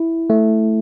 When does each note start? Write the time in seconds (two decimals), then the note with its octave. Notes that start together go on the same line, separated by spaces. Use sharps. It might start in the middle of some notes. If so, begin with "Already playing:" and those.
Already playing: E4
0.30 A3